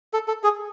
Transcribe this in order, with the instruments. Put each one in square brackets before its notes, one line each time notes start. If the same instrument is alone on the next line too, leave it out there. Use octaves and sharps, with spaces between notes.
[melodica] A4
A4
G#4